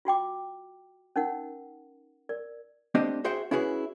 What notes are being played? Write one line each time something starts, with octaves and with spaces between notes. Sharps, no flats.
F4 F#4 G5 D6
C#4 D#4 A#4 F#5
A#4 D5
A3 C4 D4 G4 C5 D#5
F#4 G#4 C5 E5 F#5 G5
C#4 E4 F#4 G#4 B4